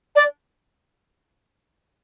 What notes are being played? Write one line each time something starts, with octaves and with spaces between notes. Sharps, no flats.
D5